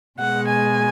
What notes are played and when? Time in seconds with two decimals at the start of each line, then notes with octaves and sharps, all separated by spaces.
0.19 B2 G#3 F#5
0.48 G#5